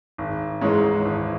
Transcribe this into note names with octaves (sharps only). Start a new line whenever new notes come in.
G#1
G#2 E3 G#3 C#4
G#1